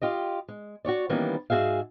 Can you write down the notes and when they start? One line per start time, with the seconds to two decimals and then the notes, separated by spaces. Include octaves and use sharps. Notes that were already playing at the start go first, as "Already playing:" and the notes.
0.02 F4 G4 D#5
0.48 G#3
0.85 F#4 G4 C#5 D5
1.09 D#3 E3 G3 A#3 B3 C#4
1.50 G#2 F#4 G#4 E5 F5